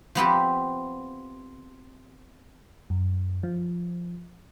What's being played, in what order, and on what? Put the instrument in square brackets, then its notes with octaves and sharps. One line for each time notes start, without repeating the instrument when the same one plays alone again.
[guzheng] F3 B3 C4 G4
[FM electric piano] F#2
F3